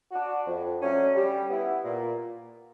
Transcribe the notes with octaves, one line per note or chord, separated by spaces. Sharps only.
D4 F#4
F2
D3 F#3 A3 C#4
G3
B3 E4
A#2